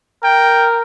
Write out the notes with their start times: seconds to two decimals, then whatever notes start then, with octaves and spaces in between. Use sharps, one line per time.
0.24 A#4 G5